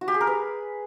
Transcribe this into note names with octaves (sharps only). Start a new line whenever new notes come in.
F#4
G4
G#4
A#4
B4